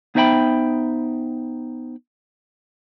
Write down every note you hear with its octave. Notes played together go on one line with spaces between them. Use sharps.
B3 D#4 C5 E5 G5 B5